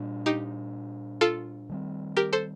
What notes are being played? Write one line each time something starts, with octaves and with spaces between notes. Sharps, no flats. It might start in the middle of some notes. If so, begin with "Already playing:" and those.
Already playing: A#2 G3 D4
D#4 G4
F4 A4
D#3 G3 C4
G4 A#4
A4 C5